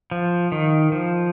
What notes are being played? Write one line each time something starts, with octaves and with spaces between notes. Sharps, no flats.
F3
D#3
F3